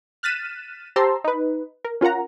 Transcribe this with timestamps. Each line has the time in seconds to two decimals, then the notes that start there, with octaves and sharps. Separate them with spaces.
0.23 F6 F#6 A6 B6 D#7 E7
0.96 G4 C5 A5 A#5 C6 E6
1.24 D#4 B4
1.85 A#4
2.01 C#4 F4 A#4 F#5 A#5